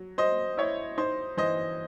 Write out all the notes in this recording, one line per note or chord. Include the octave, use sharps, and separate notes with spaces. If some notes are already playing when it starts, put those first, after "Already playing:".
Already playing: F#3
F#3 C5 D#5
E4 C#5
D#4 C5
E3 C5 D#5